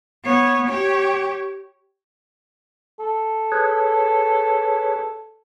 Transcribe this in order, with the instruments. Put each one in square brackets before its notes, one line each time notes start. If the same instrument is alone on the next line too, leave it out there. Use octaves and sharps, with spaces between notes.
[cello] B3 C#5
G4 C#5
[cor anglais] A4
[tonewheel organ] G#4 B4 C#5